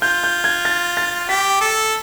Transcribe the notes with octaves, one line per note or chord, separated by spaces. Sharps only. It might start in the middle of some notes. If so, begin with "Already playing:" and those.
F4 G6
G6
G#6
A6
A6
G4 B6
A4